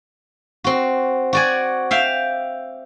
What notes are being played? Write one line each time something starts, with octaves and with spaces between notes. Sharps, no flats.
C4 F#4
F#4 D5 G#5
E5 F5 G5